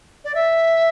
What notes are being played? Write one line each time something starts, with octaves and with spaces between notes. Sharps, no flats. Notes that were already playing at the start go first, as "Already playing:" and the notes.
D5
E5